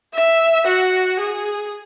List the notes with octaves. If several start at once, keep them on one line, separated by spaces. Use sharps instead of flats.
E5
F#4
G#4